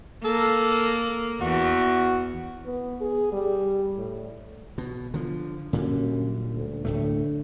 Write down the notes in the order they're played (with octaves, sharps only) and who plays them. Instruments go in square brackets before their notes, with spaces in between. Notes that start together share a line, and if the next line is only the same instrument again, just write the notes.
[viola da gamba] A#3 [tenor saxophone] A4
[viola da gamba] E2 [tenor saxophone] F#4
[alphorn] B3
G#4
G3
A2
[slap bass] B2
D3 F3
[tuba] F#2 [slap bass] A#2 D3 G3
[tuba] D2
[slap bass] D1 A2 A3 [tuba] D3